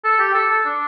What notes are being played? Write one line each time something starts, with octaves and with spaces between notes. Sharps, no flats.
A4
G4
A4
A4
D4